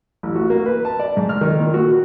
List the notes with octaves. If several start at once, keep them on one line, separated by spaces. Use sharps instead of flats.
A1
F#4
A#3
B4
A5
D5
G#2
F6
D#3
A#2
F#4
F#4